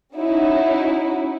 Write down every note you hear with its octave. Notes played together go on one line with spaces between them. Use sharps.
C#4 D#4 E4 F#4